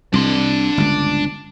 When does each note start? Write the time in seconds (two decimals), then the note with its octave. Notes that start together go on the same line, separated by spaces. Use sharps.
0.14 C2 D4 C6
0.77 G1 C#2